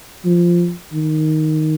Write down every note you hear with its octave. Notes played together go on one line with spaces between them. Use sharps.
F3
D#3